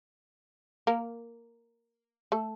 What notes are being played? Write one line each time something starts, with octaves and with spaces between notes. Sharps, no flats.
A#3 A#4
A3 A4